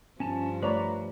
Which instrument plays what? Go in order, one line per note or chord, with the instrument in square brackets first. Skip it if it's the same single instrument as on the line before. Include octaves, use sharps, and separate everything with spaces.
[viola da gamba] G2 F3 [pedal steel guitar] C#4 A5
[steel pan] A3 C#5 D5 [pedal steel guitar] B4 A#5